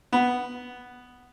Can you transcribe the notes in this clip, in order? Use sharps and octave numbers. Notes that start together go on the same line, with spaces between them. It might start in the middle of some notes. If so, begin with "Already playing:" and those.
B3